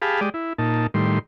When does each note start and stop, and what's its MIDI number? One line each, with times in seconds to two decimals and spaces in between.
0.02 0.21 67
0.02 0.21 68
0.02 0.21 77
0.02 0.21 81
0.02 0.21 83
0.21 0.29 56
0.21 0.29 67
0.21 0.29 74
0.21 0.29 87
0.34 0.53 64
0.58 0.87 46
0.58 0.87 63
0.58 0.87 81
0.94 1.19 45
0.94 1.19 51
0.94 1.19 55
0.94 1.19 84